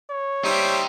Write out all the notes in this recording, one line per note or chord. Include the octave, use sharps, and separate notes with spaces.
C#5
G3 D#4 G4 C5 E5